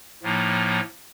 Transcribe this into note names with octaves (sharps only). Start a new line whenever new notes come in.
A2 F3 A#3 D#4